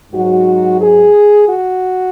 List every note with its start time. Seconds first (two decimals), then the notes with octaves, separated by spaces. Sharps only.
0.12 G#2 F#3 F#4
0.81 G#4
1.48 F#4